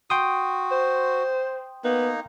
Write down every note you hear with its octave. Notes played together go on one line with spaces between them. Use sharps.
F#4 G5 C6 D#6
C5
A#3 B3 D#4